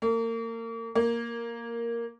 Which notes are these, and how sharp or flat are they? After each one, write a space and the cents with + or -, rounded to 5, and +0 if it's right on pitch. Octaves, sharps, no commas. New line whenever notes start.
A#3 -35
A#3 +0